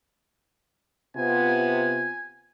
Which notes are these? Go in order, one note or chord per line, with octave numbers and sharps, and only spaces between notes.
C3 B3 F4 G#5